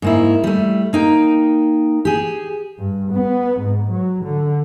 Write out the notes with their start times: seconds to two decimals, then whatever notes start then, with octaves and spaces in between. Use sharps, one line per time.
0.02 G#2 A#3 E4
0.44 G3 A3
0.93 A#3 D#4 G5
2.05 G4 G#4
2.79 G2
3.12 B3
3.60 G#2
3.91 F#3
4.24 D3